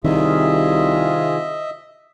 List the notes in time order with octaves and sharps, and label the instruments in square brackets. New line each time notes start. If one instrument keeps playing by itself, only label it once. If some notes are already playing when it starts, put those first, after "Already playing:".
[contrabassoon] C2 [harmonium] C3 F4 G#4 [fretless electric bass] D#3 [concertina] D#5 E5